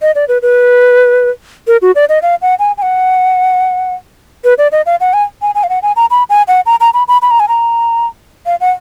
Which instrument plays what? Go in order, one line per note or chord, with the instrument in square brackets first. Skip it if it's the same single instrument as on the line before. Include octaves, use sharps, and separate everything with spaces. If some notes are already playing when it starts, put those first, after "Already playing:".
[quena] D#5
D5
B4
B4
A#4
F#4
D5
D#5
F5
F#5
G#5
G#5
F#5
B4
D5
D#5
F5
F#5
G#5
G#5
G#5
F5
F#5
G#5
A#5
B5
G#5
F#5
A#5
A#5
B5
B5
B5
A#5
G#5
A#5
F5
F#5